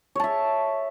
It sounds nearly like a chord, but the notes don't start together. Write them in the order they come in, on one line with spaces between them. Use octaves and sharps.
C#5 A5 E5